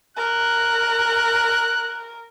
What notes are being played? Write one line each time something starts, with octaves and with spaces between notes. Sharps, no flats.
A#4 F#6